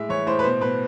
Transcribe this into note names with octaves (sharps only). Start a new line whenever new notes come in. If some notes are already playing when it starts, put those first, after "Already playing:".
Already playing: A2 G#3 E5
E3 C#5
A2 C5
B4
B2 C5
B2 B4